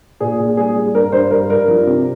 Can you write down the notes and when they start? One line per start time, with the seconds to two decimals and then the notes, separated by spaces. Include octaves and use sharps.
0.20 A#2 G#4
0.40 A#2
0.57 G3 G#4
0.75 G3
0.94 G2 A#4
1.12 G2 C5
1.31 G2 A#4
1.50 G2 A#4
1.68 F3
1.87 C3